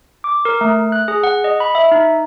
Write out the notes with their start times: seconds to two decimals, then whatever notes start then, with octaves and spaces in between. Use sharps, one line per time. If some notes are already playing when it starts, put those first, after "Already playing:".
0.24 D6
0.45 A#4
0.61 A3
0.92 F#6
1.08 G#4
1.24 F#5
1.44 D#5
1.60 B5
1.75 E5
1.91 D#4